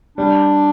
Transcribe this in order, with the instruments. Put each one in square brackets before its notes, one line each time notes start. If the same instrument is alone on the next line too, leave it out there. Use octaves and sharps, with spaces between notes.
[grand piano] G3 [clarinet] D4